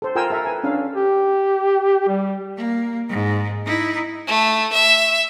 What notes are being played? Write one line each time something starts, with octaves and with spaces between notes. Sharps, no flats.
A4 C5
F4 A#4 G5 G#5 E6
A4 A#4 E5 A#5
B4 G#5
C#4 D4 A4 F5
G4
G3
A#3
G#2
D#4 E4
A3
E5